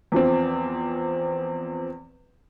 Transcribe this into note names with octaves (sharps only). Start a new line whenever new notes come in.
E2 F3 C4